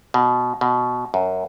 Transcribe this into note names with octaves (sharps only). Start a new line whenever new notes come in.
B2
B2
F#2